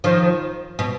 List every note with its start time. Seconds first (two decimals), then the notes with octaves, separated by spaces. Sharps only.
0.04 D#3 F3
0.79 B2